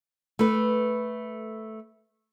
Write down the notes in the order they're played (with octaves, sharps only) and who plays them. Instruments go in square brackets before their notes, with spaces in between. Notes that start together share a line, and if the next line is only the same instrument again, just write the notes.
[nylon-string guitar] A3 B4